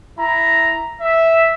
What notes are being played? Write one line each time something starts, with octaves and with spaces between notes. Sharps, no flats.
E4 A#5
E5